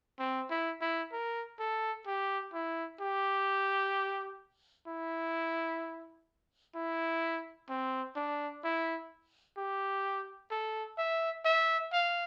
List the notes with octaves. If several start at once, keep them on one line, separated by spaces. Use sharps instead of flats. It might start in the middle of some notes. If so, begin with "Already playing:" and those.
C4
E4
E4
A#4
A4
G4
E4
G4
E4
E4
C4
D4
E4
G4
A4
E5
E5
F5